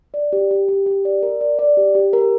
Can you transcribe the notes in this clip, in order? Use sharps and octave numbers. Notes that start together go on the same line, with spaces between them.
D5
G4
G4
G4
G4
D5
A#4
D5
D5
G4
G4
A#4